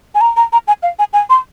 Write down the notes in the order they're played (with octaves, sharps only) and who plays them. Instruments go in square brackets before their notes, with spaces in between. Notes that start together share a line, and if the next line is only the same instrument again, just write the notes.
[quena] G#5
A#5
A#5
A#5
G#5
F5
G#5
G#5
C6